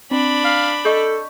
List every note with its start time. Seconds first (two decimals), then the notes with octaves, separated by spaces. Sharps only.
0.11 C4 D4 B5
0.45 F5 B6
0.85 A4 D#5 C#6 G6